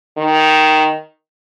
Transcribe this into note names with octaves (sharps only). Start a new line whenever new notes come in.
D#3